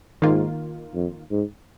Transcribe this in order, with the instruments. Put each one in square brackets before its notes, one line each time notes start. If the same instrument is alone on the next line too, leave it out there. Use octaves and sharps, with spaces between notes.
[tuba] G#2 [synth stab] D#3 A#3 F4
[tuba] F2
G#2